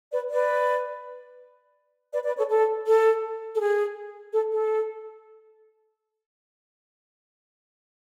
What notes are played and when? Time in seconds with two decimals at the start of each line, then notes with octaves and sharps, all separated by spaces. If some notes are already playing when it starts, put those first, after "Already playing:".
0.12 B4 D5
0.30 B4 D5
2.13 B4 D5
2.25 B4 D5
2.37 A4 C#5
2.49 A4
2.86 A4
3.54 A4
3.59 G#4
4.32 A4
4.50 A4